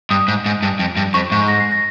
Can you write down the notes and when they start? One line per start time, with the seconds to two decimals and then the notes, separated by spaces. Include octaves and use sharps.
0.10 G2 D#6
0.28 G#2
0.46 G#2
0.62 G2
0.79 F2
0.97 G2
1.14 F2 C#6
1.32 G#2
1.48 A#6
1.60 C7
1.72 A#6